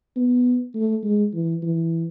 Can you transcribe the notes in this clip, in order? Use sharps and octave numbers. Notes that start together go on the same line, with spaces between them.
B3
A3
G#3
E3
E3